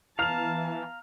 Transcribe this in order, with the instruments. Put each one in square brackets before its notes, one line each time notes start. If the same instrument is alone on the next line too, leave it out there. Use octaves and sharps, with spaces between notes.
[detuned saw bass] E3 [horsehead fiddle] B3 A5 [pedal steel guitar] F5 A#5 [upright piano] F6 F7